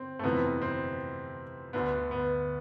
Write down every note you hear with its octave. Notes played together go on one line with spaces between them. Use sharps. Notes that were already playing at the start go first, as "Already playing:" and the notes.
Already playing: C4
A3
F2 C3 E3 B3
C4
D2 D3 B3
B3